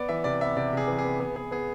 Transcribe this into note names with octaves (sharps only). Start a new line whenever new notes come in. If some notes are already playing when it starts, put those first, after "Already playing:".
Already playing: B3 D5
E3 E5
C3 D5
B3 E5
C3 D5
C3 G#4
E3
G#4
B3
B3 G#4
B3 G#4
B3 G#4